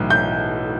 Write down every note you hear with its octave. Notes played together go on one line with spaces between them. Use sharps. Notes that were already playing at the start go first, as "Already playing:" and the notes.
Already playing: B1 A2 E3
G6